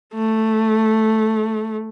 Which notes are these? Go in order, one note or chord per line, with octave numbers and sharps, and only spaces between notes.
A3